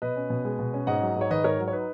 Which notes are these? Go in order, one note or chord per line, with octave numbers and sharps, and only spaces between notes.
B2 B4 D#5
C#4
B2
G#3
B2
C#4
G#2 D#5 F#5
F#3
G#2 C#5
D#3 B4 D#5
G#2 A#4 C#5
F#3
C#5
D#4 B4